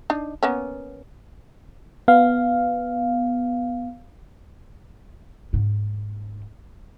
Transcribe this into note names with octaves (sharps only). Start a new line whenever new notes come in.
D4 D#4
A#3 B3 C#4
B3 F5
G#2 A#3